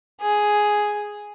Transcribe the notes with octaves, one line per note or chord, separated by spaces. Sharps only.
G#4